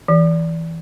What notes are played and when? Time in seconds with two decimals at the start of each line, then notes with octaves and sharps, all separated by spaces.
0.08 E3